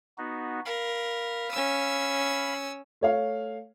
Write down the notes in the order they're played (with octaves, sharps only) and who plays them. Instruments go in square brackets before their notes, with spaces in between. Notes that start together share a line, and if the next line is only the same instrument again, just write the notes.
[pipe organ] B3 D#4 F#4
[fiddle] A#4 [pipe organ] F5 B5
[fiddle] C#4 E6
[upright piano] A3 C#5 F5